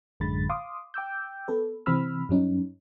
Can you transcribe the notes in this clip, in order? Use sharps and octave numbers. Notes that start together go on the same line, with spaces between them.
A1 F#2 D3 G#3 B5 A6
F5 C6 D6 D#6
G5 D6 E6 G6
B3 A4 B4
C3 E3 C4 B5 E6 F6
G2 F#3 C#4 D#4